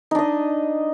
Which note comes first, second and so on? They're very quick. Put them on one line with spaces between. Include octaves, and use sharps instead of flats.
D#4 D4 D#5